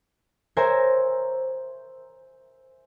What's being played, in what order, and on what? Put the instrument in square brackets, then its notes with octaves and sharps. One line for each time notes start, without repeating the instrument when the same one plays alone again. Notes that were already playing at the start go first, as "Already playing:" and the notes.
[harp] A#4 C5 C#5 E5 G#5 A#5